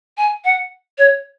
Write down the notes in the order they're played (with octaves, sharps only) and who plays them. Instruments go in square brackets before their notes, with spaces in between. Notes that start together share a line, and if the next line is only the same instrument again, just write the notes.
[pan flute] G#5
F#5
C#5